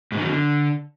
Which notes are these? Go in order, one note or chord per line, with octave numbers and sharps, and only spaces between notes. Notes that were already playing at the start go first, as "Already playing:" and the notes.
G#2
D#3
F#2
D3